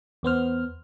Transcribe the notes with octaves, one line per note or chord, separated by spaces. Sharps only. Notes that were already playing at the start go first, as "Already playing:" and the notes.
E2 B3 C5 F6